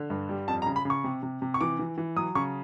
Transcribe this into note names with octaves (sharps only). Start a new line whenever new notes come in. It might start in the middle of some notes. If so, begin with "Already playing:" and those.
Already playing: D3
G2
G3
F2 A5
A#5
C#3
B5
C#3 C#6
C3
C3
C3
C#6
E3 D6
E3
E3
F#3 D#6
C#3 C#6